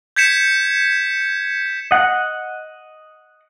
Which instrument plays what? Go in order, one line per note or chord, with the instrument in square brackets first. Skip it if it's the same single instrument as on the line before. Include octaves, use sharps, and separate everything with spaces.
[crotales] G6 G#6 B6 C#7 E7
[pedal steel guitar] D#5 F#5